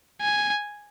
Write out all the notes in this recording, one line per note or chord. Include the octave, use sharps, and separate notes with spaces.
G#5